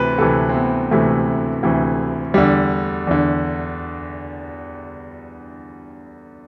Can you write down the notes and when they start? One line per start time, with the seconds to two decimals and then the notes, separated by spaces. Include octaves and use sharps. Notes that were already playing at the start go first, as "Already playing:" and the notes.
Already playing: D2 C3 E3 B4
0.18 D2 C3 E3 A4
0.49 C4
0.54 B3
0.91 D2 C3 E3 A3
1.63 D2 C3 E3
2.34 E2 D3 G3
3.07 E2 D3